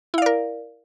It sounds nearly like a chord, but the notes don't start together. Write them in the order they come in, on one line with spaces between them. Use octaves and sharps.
E4 F5 D5 A#4